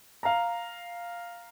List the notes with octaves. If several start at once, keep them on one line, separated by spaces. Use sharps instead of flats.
F5 A#5